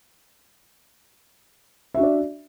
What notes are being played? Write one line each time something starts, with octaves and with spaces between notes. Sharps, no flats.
D4 F#4 D5 E5